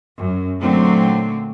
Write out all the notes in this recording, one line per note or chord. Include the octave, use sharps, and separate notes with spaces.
F#2
A#2 D3 F#3 A3 C4